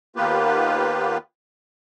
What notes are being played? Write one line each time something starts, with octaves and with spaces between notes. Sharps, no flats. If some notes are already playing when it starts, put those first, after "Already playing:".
D#2 A#3 B3 F4 G4 B4